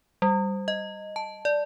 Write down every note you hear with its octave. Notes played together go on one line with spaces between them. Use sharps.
G3
D#5
A5
D5